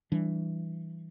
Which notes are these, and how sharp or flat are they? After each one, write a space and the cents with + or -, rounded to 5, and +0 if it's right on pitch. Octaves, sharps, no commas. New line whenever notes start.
E3 +0 G3 -15 D4 +10